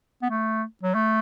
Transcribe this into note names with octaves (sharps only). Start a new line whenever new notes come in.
B3
A3
F#3
A3